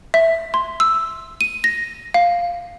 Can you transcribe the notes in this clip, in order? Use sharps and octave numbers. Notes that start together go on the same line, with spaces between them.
E5
C6
E6
D#7
A#6
F5